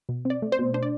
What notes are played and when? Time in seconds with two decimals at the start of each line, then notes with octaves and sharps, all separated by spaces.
0.09 B2
0.25 C4 D5
0.42 A3
0.52 C5
0.59 B2
0.74 D4 C5
0.83 D5